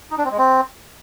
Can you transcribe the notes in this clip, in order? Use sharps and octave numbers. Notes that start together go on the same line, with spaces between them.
D#4
D4
C4
G#3
C4